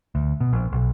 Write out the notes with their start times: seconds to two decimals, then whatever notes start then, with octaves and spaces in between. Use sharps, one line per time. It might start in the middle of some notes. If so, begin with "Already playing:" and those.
0.15 D2
0.40 B2
0.53 A#1
0.72 B1